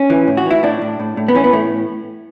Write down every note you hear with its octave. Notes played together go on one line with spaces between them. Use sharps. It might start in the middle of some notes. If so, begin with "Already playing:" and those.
Already playing: C#4
E3
A2
F#4
E3 E4
A2 D4
A2
A2
A2
B3
E3 C#4
B3
A2 A3